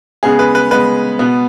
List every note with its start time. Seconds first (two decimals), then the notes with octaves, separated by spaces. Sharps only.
0.23 C#3 G#3 B3 G#4
0.39 B4
0.55 B4
0.71 C#3 G#3 B3 B4
1.19 B2 B3